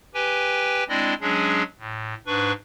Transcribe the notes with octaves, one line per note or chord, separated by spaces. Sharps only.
G4 B4 G5 G#5
G#3 C4 D4 E4 D5 D#5
F#3 G#3 C#4 D4 G#4
A2
G#2 D4 B4 C#6